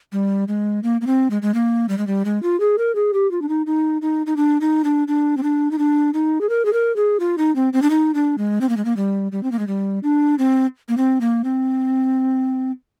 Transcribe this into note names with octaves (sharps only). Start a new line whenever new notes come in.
G3
G#3
A#3
A#3
C4
G#3
G#3
A#3
G3
G#3
G3
G#3
F4
G#4
A#4
G#4
G4
F4
D4
D#4
D#4
D#4
D#4
D4
D#4
D4
D4
C4
D4
D#4
D4
D#4
G#4
A#4
G#4
A#4
G#4
F4
D#4
C4
C4
D4
D#4
D4
G#3
C4
A#3
G#3
A#3
G3
G3
C4
A#3
G#3
G3
D4
C4
A#3
C4
A#3
C4